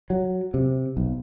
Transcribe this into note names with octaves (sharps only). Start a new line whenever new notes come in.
F#3
C3
B1